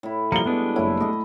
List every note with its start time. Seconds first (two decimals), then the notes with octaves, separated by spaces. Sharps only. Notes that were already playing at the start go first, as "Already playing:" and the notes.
0.03 A2 E4
0.32 F3 G3 A#3 A#5 C#7 G7
0.46 G3 G#3 B3 D4
0.76 F#1 E4 C#5
1.00 A3 D#5